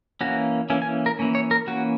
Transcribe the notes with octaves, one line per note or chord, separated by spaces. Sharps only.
E3 A#3 C#4 F#4
E3 A#3 C#4
G#5
A#4
E3 A#3 C#4
C#5
A#4
E3 A#3 C#4 F#4